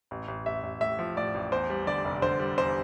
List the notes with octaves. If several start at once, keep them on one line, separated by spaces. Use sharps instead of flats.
A1
A1
A1 E5
A1
A2 E5
F3
A2 D5
A1
E2 C5
G3
D3 D5
F1
D3 C5
G3
E2 C5